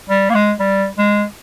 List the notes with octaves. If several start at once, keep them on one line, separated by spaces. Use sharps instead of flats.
G3
A#3
G#3
G3
G#3